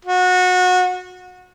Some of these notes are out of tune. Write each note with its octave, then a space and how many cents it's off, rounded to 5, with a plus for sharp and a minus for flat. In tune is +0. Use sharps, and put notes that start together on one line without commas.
F#4 -25